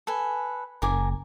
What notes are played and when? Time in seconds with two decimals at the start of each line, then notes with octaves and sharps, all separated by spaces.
0.07 A4 B4 G#5
0.82 F#1 A#4 G#5 D6